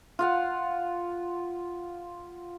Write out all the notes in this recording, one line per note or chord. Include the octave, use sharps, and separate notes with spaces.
F4 F5 F#5